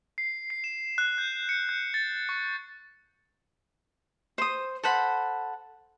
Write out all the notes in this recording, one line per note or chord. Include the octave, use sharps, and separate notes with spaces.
C7
C7
E7
F#6
G6
C#7
G6
A6
C#6
C5 D#6
A4 C5 F#5 B5